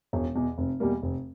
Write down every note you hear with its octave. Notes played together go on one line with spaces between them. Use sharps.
E1
E2 B2
F1
E2 B2 G3 A#3
F1